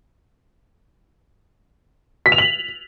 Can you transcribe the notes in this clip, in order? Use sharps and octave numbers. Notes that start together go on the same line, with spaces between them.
B6
F7
F#7